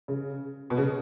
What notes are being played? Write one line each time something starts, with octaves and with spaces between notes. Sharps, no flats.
C#3
B2
C#3